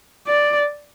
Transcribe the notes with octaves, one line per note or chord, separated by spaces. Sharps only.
D5